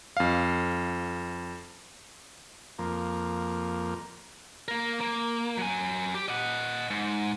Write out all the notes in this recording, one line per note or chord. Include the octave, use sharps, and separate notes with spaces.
F2 F5
F2 A#3
A#3 A#4
A#3
F#3 G#5
G4
D#5 F#5
G#2